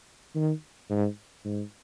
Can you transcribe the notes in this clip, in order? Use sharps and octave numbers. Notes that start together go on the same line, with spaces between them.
D#3
G#2
G#2